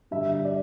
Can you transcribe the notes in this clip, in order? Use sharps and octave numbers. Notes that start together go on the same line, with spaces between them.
G2 D3 E5
D5